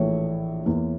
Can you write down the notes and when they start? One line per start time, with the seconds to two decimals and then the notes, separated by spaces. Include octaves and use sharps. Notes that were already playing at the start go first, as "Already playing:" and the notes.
Already playing: A#1 A2 E3 A3 C#5
0.66 E2 E3 A#3